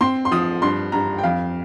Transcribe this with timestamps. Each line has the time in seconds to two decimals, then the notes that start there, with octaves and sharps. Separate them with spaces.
0.01 C4 C6
0.25 C6
0.31 F3 D#6
0.62 G2 C6
0.92 G2 A#5
1.18 G5
1.23 F2 F5